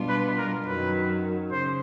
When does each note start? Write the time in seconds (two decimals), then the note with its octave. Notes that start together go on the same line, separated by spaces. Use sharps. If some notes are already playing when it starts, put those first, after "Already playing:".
Already playing: B2 G3 B3 D4 F4
0.09 B4
0.37 A#4
0.66 F#2 D#3 F#3 B4
1.51 C#3 C5